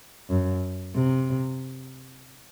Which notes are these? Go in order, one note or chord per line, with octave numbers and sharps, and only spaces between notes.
F#2
C3